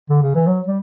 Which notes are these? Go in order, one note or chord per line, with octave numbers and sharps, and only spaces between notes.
D3
C#3
E3
F#3
G3